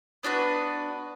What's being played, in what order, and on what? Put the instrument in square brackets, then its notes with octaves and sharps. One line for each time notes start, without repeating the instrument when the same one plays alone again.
[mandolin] B3 D4 F#4 B4